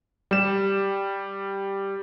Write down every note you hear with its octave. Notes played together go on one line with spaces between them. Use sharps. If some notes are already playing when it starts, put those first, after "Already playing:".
G3 E7